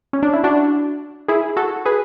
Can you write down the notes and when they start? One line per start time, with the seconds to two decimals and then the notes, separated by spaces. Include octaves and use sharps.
0.13 C#4
0.23 D4
0.33 E4
0.44 D4 F#4
1.28 E4 G#4
1.57 F#4 A4
1.85 G#4 B4